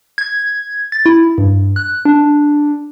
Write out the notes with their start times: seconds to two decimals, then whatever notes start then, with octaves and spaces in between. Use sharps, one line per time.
0.18 G#6
0.92 A6
1.06 E4
1.38 G2
1.76 F#6
2.05 D4